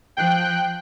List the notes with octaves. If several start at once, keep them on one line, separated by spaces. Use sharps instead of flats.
F3 G5 F#6